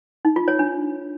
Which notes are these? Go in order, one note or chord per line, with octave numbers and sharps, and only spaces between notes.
D#4
F4
C#5
D4